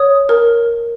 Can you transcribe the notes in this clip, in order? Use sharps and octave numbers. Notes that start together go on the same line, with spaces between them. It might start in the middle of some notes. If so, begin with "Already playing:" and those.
Already playing: C#5 D#6
A#4